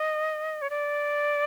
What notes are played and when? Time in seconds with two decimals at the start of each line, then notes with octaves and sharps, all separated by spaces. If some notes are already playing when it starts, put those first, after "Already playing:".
Already playing: D#5
0.62 C#5
0.70 D5